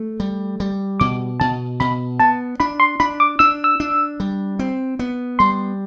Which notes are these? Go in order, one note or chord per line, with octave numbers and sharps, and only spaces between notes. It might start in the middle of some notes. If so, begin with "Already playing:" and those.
Already playing: A3
G3
G3
B2 D6
B2 A5
B2 B5
B3 A5
D4 B5
C6
D4 B5
D6
D4 E6
E6
D4
G3
C4
B3
G3 C6